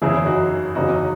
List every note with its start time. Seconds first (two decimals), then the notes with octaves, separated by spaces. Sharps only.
0.02 F#1 E2 C#3 E3 E4 G#4
0.26 D#4 F#4
0.75 F#1 E2 C#3 D#4 F#4